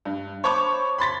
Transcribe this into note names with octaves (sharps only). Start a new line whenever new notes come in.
G2
C5 C#5 A5 B5 C#6 D6
B5 C6 A6 B6